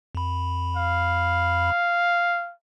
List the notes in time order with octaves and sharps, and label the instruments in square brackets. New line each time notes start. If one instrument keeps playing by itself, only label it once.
[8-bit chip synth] F2 B5
[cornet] F5